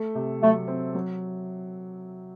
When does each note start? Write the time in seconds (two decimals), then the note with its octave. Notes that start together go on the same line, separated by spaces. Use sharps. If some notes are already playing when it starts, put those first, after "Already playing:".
Already playing: A3 A4
0.15 C3
0.42 F#3 A3
0.68 C4
0.94 F#3